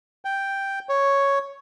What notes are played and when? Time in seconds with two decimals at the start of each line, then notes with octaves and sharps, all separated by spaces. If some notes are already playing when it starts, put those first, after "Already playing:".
0.25 G5
0.89 C#5